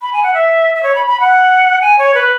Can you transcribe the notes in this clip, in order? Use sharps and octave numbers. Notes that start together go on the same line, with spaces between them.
B5
G#5
F#5
E5
E5
C#5
B5
B5
F#5
G#5
C#5
B4